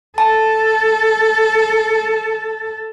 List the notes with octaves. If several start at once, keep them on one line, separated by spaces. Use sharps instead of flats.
A4 A5